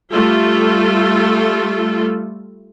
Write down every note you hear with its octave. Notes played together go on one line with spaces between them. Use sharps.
G3 A3 F4 A4